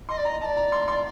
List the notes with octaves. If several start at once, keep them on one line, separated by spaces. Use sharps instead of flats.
D#5 C6
D5
D#5 A#5
D#5 A5
D5
A#5
C6
C6